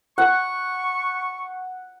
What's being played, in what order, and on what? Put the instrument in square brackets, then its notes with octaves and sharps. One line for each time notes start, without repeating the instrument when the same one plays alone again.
[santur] F#5 [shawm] C#6